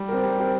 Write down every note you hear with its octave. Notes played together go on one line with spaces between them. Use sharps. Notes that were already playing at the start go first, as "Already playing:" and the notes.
Already playing: G3
C4 G4 A#4
G3
C4 G4 A#4